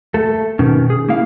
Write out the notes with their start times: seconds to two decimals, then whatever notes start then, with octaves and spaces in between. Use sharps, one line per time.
0.14 A3 A4
0.59 B2 D#3 C#4
0.90 G#4
1.09 A#3 E4 F5